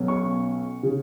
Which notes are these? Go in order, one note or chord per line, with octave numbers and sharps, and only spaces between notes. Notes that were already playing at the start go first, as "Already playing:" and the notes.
Already playing: B1 B2 F#3 C#4
C#6
C#3